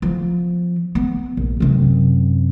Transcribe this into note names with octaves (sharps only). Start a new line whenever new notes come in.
F3 B3
B3
A#1
F#2 C3